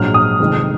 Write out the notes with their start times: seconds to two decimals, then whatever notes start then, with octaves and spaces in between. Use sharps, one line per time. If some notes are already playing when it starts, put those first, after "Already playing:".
Already playing: A#1 G#2 F#3 F6
0.14 D#6
0.40 F1 F2 D#3 G#3